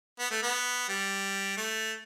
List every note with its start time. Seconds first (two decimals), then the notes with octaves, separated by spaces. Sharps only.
0.19 B3
0.31 A3
0.43 B3
0.89 G3
1.57 A3